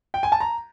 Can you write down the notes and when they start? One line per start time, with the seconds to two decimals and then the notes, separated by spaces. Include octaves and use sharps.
0.14 G5
0.23 G#5
0.32 A5
0.40 A#5